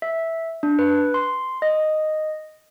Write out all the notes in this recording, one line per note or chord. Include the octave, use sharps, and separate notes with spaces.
E5
D4
B4
C6
D#5